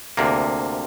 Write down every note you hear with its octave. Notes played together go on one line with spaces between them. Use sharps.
D2 C3 A#3